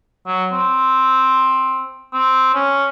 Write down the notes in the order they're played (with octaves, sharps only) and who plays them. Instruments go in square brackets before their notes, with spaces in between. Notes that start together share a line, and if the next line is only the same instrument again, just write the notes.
[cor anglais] F#3
C4
C4
C#4